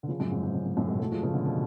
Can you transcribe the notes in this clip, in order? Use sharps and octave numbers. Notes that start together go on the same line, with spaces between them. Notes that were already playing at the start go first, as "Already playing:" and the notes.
D3
C#3 F3
F#2 A2
G#2
G#2
F#2
G#2
F#2 A2
G#2 B2
F#3 A3
F3 G#3
C#3 F3
B2 D3
B2